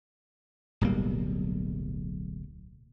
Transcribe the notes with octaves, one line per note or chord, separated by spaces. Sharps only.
D1 B1 G3 A#3